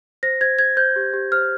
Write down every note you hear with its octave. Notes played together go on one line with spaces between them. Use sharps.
C5 A#6
C5 G#6
C5 G#6
C5 G6
G4
G4
C5 F6